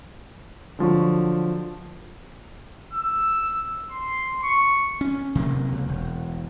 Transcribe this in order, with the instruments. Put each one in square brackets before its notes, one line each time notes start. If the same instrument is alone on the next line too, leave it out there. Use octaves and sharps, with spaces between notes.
[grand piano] D3 F3 F#3 C#6
[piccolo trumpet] E6
C6
C#6
[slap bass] C#4
C3 F#3 G3 A#3
C#2
E1